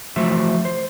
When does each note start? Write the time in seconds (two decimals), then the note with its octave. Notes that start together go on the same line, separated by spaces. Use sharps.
0.16 E3 F3 A3 F#4 C5 E5
0.65 C5